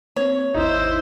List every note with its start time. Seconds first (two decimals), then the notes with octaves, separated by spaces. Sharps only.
0.16 A#3 C4 C#5
0.54 G#1 D#2 D#4 E4 C5